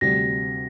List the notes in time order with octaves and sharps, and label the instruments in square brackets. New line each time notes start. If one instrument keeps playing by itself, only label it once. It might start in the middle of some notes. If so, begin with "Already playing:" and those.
[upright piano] D2 C3 G3 [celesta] A#6